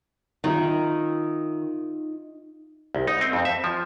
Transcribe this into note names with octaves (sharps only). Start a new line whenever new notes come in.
D#3 D#4 F4 E5
C2
D#4
C4
F2
E5
F3